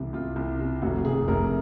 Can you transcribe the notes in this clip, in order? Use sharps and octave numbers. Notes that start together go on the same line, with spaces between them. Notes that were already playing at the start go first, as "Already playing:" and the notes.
Already playing: C2 C3 E3
C2 F4
C2
C3
F1 F#4
F1 G#4
F1 A#4